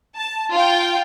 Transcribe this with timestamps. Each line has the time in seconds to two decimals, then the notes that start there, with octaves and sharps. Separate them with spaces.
0.16 A5
0.52 F4 G5